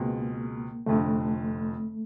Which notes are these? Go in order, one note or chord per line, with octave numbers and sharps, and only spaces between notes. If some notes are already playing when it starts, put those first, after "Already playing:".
Already playing: C#2 B2 G#3 A#3 C4
F1 F2 D3 A3